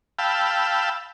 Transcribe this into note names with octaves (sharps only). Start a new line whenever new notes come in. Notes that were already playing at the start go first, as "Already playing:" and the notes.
F5 G5 A5 B5 E6